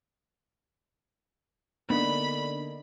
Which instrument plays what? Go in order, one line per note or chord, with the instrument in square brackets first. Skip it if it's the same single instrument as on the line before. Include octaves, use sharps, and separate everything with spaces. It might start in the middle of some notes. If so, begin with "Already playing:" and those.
[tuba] D3 [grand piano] A#3 D4 D#4 [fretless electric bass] B3 [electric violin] B5